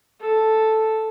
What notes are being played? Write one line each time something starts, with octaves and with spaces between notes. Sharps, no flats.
A4